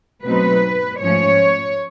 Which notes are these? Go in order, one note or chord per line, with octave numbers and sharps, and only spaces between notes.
B2 F#3 A3 C4 D#4 B4
G#2 F3 A3 C#4 C#5